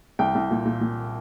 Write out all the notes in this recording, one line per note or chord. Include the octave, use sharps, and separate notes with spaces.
C2 G5
C2
A#2
A#2
A#2